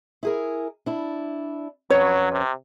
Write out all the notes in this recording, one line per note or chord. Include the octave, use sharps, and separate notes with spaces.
E4 G#4 A#4
D4 E4
F2 F#3 C#4 B4 C#5
C3